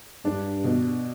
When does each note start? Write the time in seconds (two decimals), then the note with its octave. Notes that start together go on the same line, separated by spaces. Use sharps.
0.25 G2 D4
0.64 B2